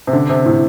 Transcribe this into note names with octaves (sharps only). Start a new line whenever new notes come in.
C3
D3
C3
A2